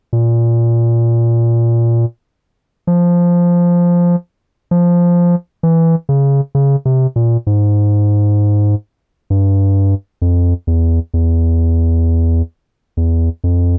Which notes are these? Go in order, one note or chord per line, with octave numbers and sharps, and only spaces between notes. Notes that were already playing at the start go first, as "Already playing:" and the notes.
A#2
F3
F3
E3
C#3
C#3
C3
A#2
G#2
G2
F2
E2
E2
E2
F2